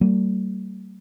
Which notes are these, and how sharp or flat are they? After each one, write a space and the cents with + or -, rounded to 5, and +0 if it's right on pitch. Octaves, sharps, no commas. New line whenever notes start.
G3 -35 A#3 -45